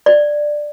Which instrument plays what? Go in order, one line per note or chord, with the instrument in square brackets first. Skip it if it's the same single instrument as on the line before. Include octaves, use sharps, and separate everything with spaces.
[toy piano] D5